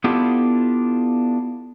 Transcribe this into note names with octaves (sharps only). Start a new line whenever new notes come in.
B3 D4 E4 F4 G4 A4